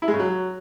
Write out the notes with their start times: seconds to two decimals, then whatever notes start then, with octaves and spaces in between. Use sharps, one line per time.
0.02 E4
0.08 G#3
0.14 C#3
0.20 F#3